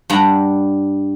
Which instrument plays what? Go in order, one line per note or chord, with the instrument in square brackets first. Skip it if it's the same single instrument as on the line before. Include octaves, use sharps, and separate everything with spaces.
[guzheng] G2 D4 F#5 A#5